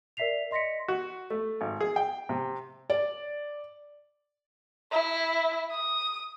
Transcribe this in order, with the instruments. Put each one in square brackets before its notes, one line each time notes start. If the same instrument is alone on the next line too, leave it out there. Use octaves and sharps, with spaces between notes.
[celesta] A#4 D5 E5 B6 C7 F7
D#5 C6 A#6 B6 C#7
[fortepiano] F#4
A3
G#1
G#4
G5
C3
[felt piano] D5
[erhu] E4
D#6